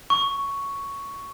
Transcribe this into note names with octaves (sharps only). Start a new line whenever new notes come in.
C#6